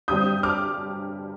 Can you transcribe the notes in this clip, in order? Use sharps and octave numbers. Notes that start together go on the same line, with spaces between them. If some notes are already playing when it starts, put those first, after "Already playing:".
G2 D3 G3 C4 D#6 G6
D6 F6